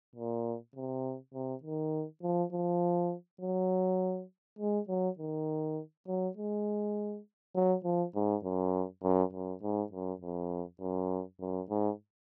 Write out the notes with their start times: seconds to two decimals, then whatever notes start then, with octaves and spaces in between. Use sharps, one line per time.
0.16 A#2
0.76 C3
1.34 C3
1.64 D#3
2.23 F3
2.53 F3
3.41 F#3
4.59 G#3
4.89 F#3
5.19 D#3
6.08 F#3
6.37 G#3
7.56 F#3
7.85 F3
8.15 G#2
8.44 F#2
9.03 F#2
9.33 F#2
9.63 G#2
9.92 F#2
10.22 F2
10.81 F#2
11.40 F#2
11.70 G#2